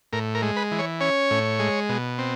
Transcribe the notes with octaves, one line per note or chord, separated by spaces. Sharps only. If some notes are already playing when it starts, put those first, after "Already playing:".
A2 A#4
A#4
G#3
B4
E3
C#5
C#4 C#5
A2
G#3
B2
C4